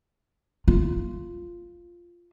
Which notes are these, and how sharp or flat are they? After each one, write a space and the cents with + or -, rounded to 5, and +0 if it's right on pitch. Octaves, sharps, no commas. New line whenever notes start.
F4 -5